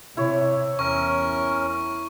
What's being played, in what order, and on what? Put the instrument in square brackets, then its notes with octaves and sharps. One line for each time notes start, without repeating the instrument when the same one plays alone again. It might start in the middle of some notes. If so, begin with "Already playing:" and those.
[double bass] C3 [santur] E4 C#5
[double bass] E2 [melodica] C#4 A#4 [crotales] C#6